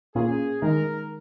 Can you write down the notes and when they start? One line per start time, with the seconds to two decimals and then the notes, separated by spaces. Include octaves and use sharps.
0.15 A#2 A#3 C#4 F4 G#4
0.62 D#3 G#3 D#4 A#4